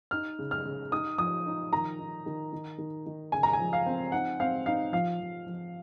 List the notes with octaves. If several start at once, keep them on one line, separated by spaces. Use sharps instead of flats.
D#4 F6
C#3
F6
C#3
D#4 D#6
F3 D#6
D#4
D#3 A#5
D#4
D#3
D#3
D#3
D#3
C#3 G#5
A#5
G#5
F3
F5
C4
D#4 F#5
C4 F5
D#4 F5
F3 F5
F3
F3